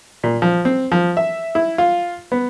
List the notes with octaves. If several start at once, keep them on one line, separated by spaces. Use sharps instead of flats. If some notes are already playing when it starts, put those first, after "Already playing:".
A#2
F3
C4
F3
E5
E4
F4
B3